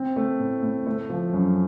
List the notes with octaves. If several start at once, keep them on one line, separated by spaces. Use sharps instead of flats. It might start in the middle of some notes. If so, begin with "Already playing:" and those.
Already playing: C4
A3
A2
A2
A3
F3
F#2